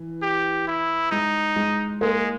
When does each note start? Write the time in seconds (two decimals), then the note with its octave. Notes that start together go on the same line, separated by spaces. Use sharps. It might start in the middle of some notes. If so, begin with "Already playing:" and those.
Already playing: E3
0.22 G4
0.67 E4
1.11 G#3 D#4
1.56 G#3
2.01 G#3 A#3